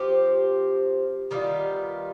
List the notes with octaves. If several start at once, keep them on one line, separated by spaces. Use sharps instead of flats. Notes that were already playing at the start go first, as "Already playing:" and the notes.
Already playing: F3 C4 G4
D#3 G3 B3 F4